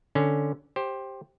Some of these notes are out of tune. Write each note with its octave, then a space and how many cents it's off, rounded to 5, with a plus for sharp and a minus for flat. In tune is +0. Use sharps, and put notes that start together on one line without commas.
D3 +0 C#4 +0
G4 +0 C5 +15